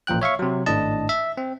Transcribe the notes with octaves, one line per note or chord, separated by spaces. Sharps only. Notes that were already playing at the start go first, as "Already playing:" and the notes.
A1 A#2 F3 G5 F#6
C#5 E5 F5 C#6
C3 F#3
G#1 A2 D4 D#5 A5
E5
C4